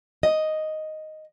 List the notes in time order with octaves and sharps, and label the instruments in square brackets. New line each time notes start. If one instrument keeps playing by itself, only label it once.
[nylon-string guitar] D#5